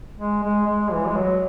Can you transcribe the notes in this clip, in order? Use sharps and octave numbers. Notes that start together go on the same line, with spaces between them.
G#3
G#3
G#3
E3
G#3
F#3